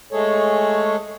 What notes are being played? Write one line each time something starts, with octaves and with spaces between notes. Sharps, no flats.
G#3 A3 G#4 A4 C#5